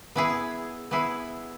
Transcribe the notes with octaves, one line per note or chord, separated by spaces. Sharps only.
B3 E4 G#4
B3 E4 G#4